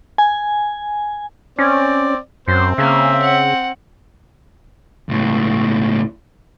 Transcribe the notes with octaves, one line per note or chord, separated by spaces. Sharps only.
G#5
C4 C#4 D5
F#2 C4 C5
C#3 A#3 E5
F#5
C#2 A2